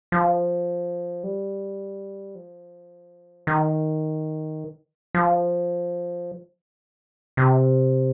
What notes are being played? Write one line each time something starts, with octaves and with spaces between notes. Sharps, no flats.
F3
G3
F3
D#3
F3
C3